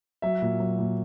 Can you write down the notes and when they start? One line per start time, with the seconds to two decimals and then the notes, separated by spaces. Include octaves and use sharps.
0.22 F#3 E5
0.42 A#2
0.60 F#3
0.79 A#2